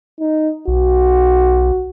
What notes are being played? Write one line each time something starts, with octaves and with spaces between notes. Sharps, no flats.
D#4
B1 F#4